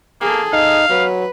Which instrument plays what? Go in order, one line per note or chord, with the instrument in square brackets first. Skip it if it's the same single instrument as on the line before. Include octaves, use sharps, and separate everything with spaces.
[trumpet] A#3 [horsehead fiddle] G#4 A4
[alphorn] D#4 [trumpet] F5
[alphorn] F#3 [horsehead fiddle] B4